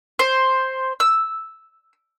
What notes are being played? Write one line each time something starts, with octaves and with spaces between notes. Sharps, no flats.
C5
E6